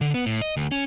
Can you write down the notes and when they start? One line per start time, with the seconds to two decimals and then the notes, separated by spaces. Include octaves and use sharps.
0.01 D3
0.14 B3
0.26 A2
0.41 D#5
0.57 D2
0.72 C#4